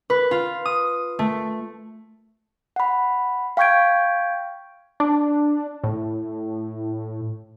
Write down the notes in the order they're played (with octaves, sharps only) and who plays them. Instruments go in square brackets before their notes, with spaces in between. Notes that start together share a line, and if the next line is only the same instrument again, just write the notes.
[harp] B4
F4
D#6
A3
[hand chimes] F#5 B5
F5 G5 C#6 G6 G#6 D7
[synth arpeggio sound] D4
A2